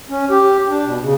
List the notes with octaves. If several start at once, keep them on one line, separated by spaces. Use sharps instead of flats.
C#4
G4
D4
B2
C#3